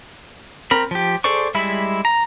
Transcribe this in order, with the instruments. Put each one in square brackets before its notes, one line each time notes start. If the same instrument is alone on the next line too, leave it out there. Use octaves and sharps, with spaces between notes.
[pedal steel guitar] C4 A#4 B5
F3 G4
G#4 A4 C5 D5 C#6
G3 G#3 E4 E5 B5
A#5